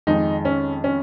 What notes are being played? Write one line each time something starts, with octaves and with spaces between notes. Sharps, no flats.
F2 D#3 G#3 D#4
C#4
C#4